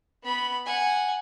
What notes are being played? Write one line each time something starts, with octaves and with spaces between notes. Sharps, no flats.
B3 B5
F#5 G#5